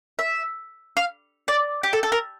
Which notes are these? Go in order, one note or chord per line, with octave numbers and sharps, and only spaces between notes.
E5
F5
D5
G4
A4
A4
A#4